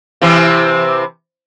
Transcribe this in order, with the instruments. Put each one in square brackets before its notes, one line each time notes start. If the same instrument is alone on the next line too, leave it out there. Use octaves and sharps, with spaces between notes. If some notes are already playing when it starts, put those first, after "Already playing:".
[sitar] C3 E3 C4